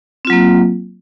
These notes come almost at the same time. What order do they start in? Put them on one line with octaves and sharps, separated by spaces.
C4 F4 F#3 A#3